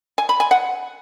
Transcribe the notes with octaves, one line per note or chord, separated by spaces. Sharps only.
G#5
B5
G#5
F#5